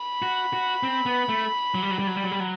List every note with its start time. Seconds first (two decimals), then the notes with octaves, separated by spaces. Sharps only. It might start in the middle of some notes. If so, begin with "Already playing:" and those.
Already playing: B5
0.22 F#4
0.53 F#4
0.83 C4
1.06 B3
1.29 A3
1.75 F#3
1.82 G3
1.91 F#3
1.99 G3
2.07 F#3
2.16 G3
2.24 F#3
2.31 G3
2.40 F#3